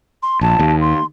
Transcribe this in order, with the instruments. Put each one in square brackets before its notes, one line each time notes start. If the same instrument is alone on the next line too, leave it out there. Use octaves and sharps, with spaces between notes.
[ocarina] C6
[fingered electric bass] A#1 [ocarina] A5
[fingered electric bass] D#2
[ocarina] C6